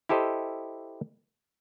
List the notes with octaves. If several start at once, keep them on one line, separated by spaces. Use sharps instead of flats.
E4 G4 A4 C5 D#5